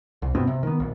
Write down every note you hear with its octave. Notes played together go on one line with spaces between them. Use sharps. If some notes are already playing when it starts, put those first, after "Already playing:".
C2
G2 B2 B3 C4
C3
D#3 B3
A#1